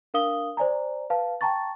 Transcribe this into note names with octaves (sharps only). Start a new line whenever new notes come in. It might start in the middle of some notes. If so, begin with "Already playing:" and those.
D4 A#4 F5 D#6 G7
C5 D5 G#5 A#5
B4 F5 A5
G5 A5 A#5 C#6 A6